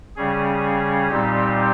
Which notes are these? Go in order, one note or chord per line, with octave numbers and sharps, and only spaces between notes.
C#3 G3 C#4 G#4
A#2 G3 C4 D#4 G4